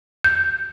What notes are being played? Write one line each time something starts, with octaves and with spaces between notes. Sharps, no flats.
G6